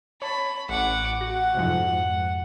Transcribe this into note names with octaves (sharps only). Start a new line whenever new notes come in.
C#5 A5 B5
A1 F#5 D6
F#4 F#5
F2 G#2 C3